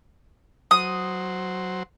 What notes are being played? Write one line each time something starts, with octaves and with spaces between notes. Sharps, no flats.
F#3 C5 D#6